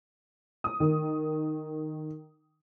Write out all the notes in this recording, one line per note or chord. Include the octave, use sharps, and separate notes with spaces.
D#6
D#3